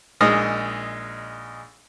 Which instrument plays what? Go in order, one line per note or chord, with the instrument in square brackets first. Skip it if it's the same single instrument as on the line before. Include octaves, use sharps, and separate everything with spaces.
[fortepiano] A#1 G#3 D#4 D#5 D#6 F6